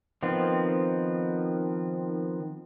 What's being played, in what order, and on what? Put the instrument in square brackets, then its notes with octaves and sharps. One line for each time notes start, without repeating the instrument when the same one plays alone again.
[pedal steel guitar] D#3 F3 B3 C4